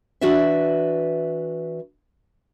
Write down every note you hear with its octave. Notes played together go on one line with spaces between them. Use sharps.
E3 D4 F#4 B4 D5 E5